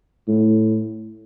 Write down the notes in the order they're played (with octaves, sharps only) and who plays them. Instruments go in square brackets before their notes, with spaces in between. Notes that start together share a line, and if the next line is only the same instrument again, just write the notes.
[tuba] A2